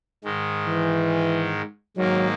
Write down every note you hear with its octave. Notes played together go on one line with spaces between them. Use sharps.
G#2 D#3 G#3
E3
G#2 D#3 F#3 A#3